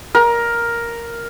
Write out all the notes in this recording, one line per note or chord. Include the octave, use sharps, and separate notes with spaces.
A#4